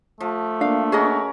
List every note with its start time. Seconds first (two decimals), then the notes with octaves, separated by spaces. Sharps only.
0.20 F3 A3
0.61 A#3 D4 F5
0.92 C#4 F#4 G#4 A#4 D#5